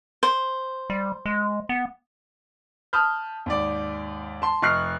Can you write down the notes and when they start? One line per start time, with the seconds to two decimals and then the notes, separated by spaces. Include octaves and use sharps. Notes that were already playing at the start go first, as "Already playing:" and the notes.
0.23 C5
0.90 G3
1.26 G#3
1.69 B3
2.93 A5 B5 D#6 F6 G6
3.46 D#2 G#2 D5
4.42 A5 C6
4.62 F1 D#5 C#6 F6 F#6 C7